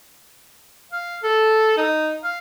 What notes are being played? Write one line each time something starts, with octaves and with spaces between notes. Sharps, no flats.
F5
A4
D#4
F5